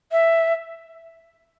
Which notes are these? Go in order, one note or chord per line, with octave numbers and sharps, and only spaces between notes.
E5